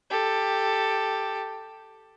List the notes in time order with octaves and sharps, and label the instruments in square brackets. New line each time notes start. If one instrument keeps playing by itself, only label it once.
[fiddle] G4 A4